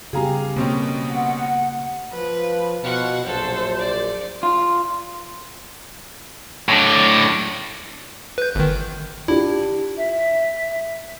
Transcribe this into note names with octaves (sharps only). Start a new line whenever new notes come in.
C#3 B3 G4 G#4 F5 A#5
B2 A#3 C4 C#4
F#5
F3 B4
B2 F4 F#4 F#5
A#1 F#2 A4 C5
D5
F4
A2 D4
B4 G6
G1 D#3
D4 E4 F4 G4
E5